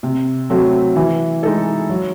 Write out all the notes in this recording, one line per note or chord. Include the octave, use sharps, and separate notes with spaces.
C3
F#3 A3 C4 F#4
E3
G#3 D#4 A4
F#3